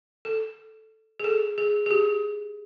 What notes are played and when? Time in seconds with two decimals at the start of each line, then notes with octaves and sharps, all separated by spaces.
0.25 A4
1.20 G#4
1.24 A4
1.58 G#4
1.86 G#4
1.91 G4